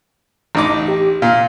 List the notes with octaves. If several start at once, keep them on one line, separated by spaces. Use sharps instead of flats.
A1 D#4 D6
G4
A#2 F5